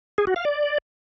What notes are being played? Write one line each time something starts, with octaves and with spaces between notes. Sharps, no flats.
G#4
F#4
F5
D5